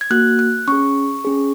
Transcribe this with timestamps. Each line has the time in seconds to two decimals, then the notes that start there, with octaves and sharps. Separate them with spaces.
0.01 G#6
0.10 A#3 F#4 F#6
0.39 F#6
0.68 C#4 G#4 C#6
1.25 C#4 G#4